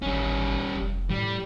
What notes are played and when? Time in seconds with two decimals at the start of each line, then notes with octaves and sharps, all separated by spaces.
0.02 G#1 G3 C#4
0.75 F1
1.10 A2 G3